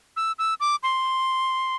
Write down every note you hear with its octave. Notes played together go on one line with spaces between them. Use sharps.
E6
E6
D6
C6